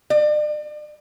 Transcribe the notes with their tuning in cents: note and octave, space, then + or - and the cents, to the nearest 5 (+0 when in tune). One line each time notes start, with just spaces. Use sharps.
D5 +40